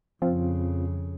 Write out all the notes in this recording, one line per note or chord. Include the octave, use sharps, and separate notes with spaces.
F2 C#3 F3 C4 F4